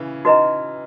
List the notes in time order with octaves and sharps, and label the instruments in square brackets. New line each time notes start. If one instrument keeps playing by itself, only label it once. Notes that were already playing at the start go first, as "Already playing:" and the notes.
Already playing: [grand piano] C#3 E3
[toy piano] D#4 F#4 B4 D#5 A#5